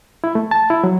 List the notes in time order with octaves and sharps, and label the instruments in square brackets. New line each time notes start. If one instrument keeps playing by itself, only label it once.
[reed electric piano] E4
A3
A5
E4
F#3